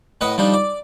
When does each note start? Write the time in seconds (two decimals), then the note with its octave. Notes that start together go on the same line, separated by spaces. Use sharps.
0.21 A2 B4 D#5 F#5 D#6
0.38 F3 G3 D4 D#4
0.53 D5